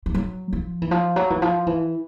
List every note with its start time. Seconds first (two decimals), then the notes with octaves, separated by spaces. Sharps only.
0.06 F3
0.15 F#3
0.53 F3
0.82 E3
0.91 F3
1.16 F#3
1.30 E3
1.42 F3
1.67 E3